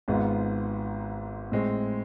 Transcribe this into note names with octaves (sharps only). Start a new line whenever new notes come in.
G#1 G#2 G#3 B3 F4
A2 G#3 C4